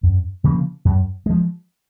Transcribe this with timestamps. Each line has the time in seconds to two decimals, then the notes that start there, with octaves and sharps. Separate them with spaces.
0.03 F#2
0.44 C#3 F3 A#3
0.85 F#2
1.26 F3 G#3